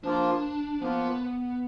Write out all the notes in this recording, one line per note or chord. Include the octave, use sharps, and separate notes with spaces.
F3 A#3 D4 F4
F3 A#3 B3 F4